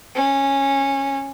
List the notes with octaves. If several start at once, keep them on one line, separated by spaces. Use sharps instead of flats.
C#4